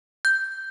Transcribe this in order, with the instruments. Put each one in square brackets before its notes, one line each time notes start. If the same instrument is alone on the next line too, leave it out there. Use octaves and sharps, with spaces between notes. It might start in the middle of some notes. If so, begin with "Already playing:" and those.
[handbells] G6